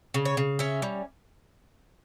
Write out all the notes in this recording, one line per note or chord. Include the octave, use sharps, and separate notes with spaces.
C#3
C#5
C#3
C#4 E5
G3